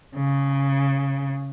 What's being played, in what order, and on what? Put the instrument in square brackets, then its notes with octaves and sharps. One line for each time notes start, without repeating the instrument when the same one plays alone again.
[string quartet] C#3